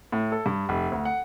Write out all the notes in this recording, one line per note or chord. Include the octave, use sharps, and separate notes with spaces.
A2
A4
G2
F1
D2
F#5